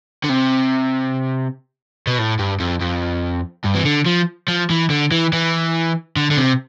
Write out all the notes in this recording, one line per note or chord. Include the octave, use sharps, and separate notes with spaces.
D3
C3
B2
A2
G2
F2
F2
G2
E3
D3
F3
F3
E3
D3
E3
E3
D3
D3
C3